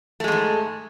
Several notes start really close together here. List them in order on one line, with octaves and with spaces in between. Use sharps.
A3 G#3 F2 G#2